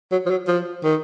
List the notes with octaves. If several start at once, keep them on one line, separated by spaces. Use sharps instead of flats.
F#3
F3
F#3
F3
D#3